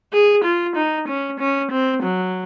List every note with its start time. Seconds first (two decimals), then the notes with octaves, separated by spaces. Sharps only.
0.13 G#4
0.44 F4
0.76 D#4
1.08 C#4
1.40 C#4
1.72 C4
2.03 F#3